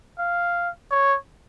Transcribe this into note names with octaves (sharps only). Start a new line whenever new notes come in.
F5
C#5